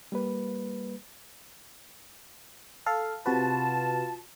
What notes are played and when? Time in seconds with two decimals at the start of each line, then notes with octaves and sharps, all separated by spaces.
0.12 G3 A#3 B4
2.86 A4 F5
3.26 C3 F4 F#4 B4 A5